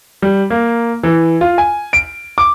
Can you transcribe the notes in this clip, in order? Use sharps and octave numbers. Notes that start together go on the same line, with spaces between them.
G3
A#3
E3
F4
G#5
D7
D6